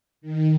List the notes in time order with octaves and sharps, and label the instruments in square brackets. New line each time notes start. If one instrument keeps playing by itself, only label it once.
[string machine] D#3